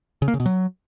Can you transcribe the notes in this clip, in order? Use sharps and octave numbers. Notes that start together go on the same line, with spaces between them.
C#3
A#3
C#3
B2
F#3